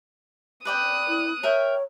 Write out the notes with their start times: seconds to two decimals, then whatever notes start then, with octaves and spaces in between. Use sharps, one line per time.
0.65 B4 D5 G5 D#6 F#6
1.08 E4
1.43 A#4 C#5 E5 G5